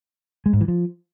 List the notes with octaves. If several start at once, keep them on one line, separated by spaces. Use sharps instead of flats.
G#3
G#2
E3
F3